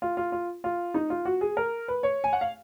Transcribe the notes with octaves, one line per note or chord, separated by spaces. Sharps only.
F4
F4
F4
F4
D#4
F4
F#4
G#4
A#4
B4
C#5
G#5
F#5
F5